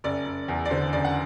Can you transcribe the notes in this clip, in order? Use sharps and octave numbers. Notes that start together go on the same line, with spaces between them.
F#1 D5
F#1
E2
D5
D3 C5
F#1 D5
F#5